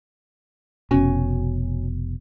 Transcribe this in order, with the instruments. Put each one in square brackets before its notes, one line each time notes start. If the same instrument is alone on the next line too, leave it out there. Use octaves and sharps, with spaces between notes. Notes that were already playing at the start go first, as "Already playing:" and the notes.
[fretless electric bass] F1 B2 [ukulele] C#4 F#4 G#5